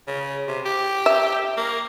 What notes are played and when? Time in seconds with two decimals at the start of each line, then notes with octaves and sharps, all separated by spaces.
0.08 C#3
0.48 C3
0.66 G4
1.06 E5
1.57 A#3